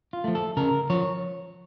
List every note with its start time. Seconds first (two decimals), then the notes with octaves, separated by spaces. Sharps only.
0.13 F4
0.24 F3 A3
0.35 A4
0.57 C#3 A#4
0.90 F3 C#5